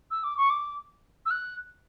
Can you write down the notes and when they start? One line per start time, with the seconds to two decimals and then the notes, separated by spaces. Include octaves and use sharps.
0.11 E6
0.24 D6
0.37 C#6
0.50 D6
1.26 E6
1.31 F#6